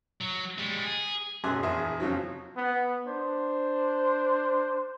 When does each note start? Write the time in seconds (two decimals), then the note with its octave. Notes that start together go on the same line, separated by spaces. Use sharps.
0.21 F#3
0.58 G3 G#3
0.84 G#4
1.44 B1 F#2 G#4 C6 D6 F#6
1.63 A#1 E2 G#4 E5 C6
2.00 F2 C#3 F3 F#3
2.55 B3
3.05 D4 C5